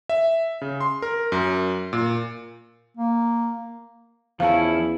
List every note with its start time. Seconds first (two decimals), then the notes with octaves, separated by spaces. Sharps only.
0.09 E5
0.61 C#3
0.81 C6
1.02 A#4
1.32 F#2
1.93 A#2
2.97 A#3
4.40 E2 F3 C#4 E4 F5 A5